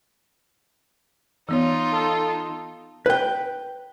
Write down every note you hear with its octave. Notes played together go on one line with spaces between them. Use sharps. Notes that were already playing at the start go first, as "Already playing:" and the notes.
E3 B3 D#4 F4 C#5
A4
B4 G5